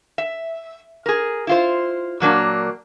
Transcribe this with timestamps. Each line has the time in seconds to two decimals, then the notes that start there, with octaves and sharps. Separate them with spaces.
0.18 E5
1.06 G#4 A#4
1.47 E4 F4 C5
2.20 A#2 F#3 A#3 D4